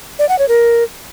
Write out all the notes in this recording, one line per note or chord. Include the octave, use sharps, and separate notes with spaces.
D5
F#5
C#5
A#4